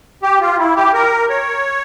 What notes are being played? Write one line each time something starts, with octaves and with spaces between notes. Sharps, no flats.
G4
F4
E4
G4
A#4
C#5